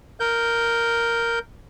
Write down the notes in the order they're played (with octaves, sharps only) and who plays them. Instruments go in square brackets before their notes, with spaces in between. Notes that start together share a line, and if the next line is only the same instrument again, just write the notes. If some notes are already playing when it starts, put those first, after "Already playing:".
[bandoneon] A#4 G6